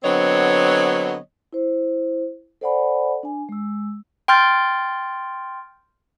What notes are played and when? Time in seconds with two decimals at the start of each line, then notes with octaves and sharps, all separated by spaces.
0.04 D3 F#3 B3 C4 C#5 D#5
1.53 E4 C5
2.61 A4 C5 D5 F#5 G#5 B5
3.23 D4 G#5
3.49 G#3 E6
4.28 G5 C6 F6 G6 A6